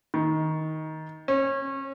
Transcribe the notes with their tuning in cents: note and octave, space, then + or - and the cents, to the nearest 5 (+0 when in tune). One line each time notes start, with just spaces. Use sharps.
D#3 +10
C#4 -30